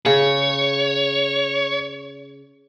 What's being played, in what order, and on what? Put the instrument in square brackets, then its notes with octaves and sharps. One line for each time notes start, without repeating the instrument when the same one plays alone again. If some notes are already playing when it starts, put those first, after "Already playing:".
[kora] C#3 [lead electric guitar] C#5